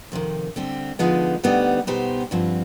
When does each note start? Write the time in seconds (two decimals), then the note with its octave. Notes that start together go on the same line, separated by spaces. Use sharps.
0.12 F2 C3 D#3
0.56 D3 G3 C4 G4
0.99 D3 F3 G#3 B3 D#4
1.44 D2 D3 G3 B3 D#4
1.87 B2 B3 D#4 G4 C5
2.31 G2 D3 F3 C4